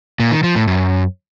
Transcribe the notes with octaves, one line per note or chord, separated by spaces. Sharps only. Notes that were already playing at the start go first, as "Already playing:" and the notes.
A#2
D#3
F3
A2
F#2